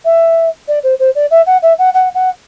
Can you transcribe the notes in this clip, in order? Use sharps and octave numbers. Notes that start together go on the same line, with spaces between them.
E5
D5
C5
C5
D5
E5
F#5
E5
F#5
F#5
F#5